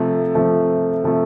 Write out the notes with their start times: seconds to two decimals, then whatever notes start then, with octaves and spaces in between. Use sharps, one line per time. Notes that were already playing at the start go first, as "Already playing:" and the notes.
Already playing: C3 F3 A3
0.35 C3 F3 A3
1.04 C3 F3 A3